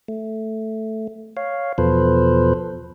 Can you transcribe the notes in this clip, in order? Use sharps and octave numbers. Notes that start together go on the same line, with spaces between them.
A3
C#5 F5
E2 B2 F3 A4 B4 C5